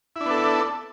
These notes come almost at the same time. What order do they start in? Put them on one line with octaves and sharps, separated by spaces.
E4 D4 B3 A4